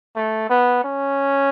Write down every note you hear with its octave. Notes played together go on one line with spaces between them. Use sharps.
A3
B3
C#4